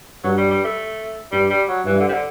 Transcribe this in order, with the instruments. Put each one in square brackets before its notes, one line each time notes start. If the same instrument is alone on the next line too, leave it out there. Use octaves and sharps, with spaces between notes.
[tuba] G2 [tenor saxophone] F#3
[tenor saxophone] G3
G3
A3
[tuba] G2 [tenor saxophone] G3
[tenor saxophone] G3
F#3
[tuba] G2 [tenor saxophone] E3
[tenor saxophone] D3
C3
D3